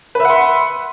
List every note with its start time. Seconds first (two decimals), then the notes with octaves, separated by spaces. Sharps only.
0.15 B4
0.20 E5
0.25 F#5
0.30 C6